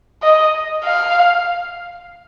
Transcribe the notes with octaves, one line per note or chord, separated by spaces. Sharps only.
D#5
F5